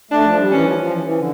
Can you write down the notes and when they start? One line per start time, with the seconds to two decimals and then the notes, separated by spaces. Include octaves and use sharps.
0.11 A3 D4
0.24 F3
0.38 G3
0.51 E3 C#4
0.65 F3
0.78 F3
0.91 E3
1.04 E3
1.18 D3